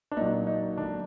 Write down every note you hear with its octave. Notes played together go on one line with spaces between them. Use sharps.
D4
A#2 F#3 D#4
D#4
D3 F#3 D4